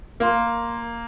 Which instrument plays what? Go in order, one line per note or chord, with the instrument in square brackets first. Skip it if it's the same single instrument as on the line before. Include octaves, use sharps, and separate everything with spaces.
[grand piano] A#3 [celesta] A#4 F5 C6